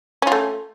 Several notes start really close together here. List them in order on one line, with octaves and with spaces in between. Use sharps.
C#4 F4 A3